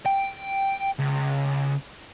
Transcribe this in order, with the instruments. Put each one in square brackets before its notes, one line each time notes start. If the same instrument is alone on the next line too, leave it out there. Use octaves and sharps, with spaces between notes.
[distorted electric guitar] G5
C#2